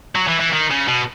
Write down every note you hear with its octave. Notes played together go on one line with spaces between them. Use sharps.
F#3
E3
E3
D#3
C#3
B2